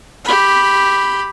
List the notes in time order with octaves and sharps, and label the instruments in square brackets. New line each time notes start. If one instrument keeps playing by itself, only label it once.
[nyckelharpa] G4 B5